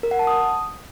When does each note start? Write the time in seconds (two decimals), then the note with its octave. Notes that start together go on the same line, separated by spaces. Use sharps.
0.03 A#4
0.11 F#5
0.19 A5
0.27 D#6